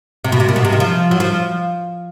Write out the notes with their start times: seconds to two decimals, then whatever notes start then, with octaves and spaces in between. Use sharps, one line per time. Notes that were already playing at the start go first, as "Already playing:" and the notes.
0.24 C3
0.32 B2
0.40 C3
0.49 A#2
0.56 B2
0.65 C3
0.72 D#3
0.80 F3
1.11 F#3
1.20 F3